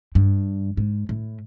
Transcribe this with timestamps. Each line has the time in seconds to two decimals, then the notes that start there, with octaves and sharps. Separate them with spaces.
0.15 G2
0.77 G#2
1.09 A2